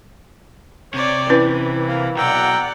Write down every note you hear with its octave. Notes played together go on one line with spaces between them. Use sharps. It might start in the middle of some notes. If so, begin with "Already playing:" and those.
C3 C#5 D5
E3 C#4 E4 B4
A#3
B1 D5 F#5 G5 A#5 E6